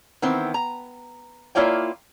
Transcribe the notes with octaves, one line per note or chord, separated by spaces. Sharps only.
D#3 E3 B3 C4
A#5
A#3 E4 F4 C#5 D5 G5